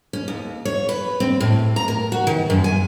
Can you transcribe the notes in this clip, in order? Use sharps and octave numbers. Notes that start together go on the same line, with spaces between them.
C#4
D#2
C#5
B4
C4
A2
A#5
A#4
F#4
D#3
F#2
G#5